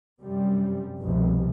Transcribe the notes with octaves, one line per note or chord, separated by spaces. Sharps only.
F#2 C3 G3
F1 C2 B2